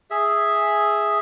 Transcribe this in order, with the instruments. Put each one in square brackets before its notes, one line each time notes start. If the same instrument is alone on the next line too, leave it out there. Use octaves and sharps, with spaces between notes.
[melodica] G#4 E5